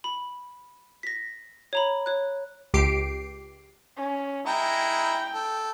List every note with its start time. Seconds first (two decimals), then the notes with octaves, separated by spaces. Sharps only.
0.04 B5
1.03 A#6 B6
1.73 C#5 A#5 B5
2.06 C#5 F#6
2.74 C#2 G4 C7 D7
3.97 C#4
4.46 G#3 E4 G5 A#5
5.33 A4